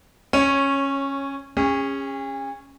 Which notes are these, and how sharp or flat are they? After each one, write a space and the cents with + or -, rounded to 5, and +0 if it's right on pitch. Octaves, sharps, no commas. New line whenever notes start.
C#4 -15 C#5 +0
C#4 -10 G#4 -40